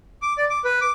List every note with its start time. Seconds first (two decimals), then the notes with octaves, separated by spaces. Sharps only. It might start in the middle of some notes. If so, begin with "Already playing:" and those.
0.22 D6
0.38 D5
0.50 D6
0.65 B4
0.81 D6